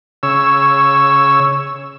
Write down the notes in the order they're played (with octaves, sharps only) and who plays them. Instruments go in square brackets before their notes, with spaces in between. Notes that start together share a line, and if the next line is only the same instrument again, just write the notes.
[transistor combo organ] C#3 C#5 E6